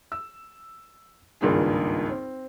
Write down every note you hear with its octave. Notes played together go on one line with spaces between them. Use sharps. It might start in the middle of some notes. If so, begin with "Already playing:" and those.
E6
G#1 C#2 G2 A#3 F4 G#4
C4